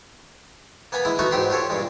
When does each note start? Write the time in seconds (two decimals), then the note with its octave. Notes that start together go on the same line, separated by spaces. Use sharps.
0.92 A#3 B3 G#5 A#5 B5
1.05 G#3 E4 D#5
1.19 A3 B3 D#4 F#4 A#5 C#6
1.31 G#2 F#3 G4 G5 B5 C6
1.50 F4 G4 A4 C#5
1.70 G2 A#2 G#3